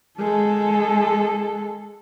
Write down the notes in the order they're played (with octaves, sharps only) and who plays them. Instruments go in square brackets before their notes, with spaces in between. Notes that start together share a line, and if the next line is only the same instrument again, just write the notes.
[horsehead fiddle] G#3 A4